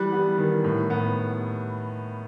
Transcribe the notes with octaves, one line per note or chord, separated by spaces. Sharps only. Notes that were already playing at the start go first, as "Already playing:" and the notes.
Already playing: E3 G3 F#6
B3
D#3
A2
B3